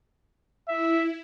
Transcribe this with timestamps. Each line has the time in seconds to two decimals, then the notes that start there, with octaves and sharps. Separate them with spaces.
0.68 E4 E5